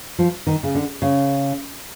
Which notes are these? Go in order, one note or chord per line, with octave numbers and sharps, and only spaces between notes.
F3
D#3
C#3
D3
C#3